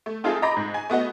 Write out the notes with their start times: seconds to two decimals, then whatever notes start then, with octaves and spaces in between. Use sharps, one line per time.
0.06 A3
0.24 C4 D#4 F4 G#4 A4 E5
0.42 D#5 A#5 B5 D6 A#6
0.56 G#2
0.74 G#5
0.90 A3 B3 F#4 D#5